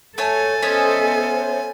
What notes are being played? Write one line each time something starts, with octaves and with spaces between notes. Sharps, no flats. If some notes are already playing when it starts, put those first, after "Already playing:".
A3 A4 C#5 G#5
B3 C#4 C5 D#5 E5